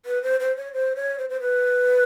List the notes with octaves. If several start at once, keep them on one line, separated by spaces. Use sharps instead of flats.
B4
C5
C5
C#5
C5
C#5
C5
C5
B4